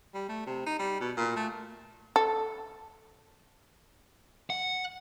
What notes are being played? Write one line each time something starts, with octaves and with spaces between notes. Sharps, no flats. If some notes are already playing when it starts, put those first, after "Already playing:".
G3
A3
C3
D#4
G3
B2
A#2
A3
A4
F#5